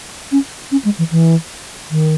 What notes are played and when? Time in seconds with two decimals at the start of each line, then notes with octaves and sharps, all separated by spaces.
0.32 C#4
0.72 C#4
0.85 G#3
0.98 E3
1.11 E3
1.91 D#3